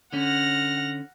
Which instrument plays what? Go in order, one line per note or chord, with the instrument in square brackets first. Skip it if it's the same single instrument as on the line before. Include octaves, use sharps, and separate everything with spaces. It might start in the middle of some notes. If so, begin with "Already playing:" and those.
[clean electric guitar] D3 C#4 [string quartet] F#5 F6 A#6